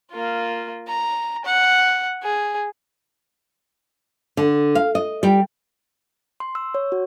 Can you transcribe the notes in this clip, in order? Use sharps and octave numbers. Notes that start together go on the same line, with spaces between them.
A#3 F4
A#5
F#5
G#4
D3
F5
D#5
G3 G5
C6
E6
C#5
F#4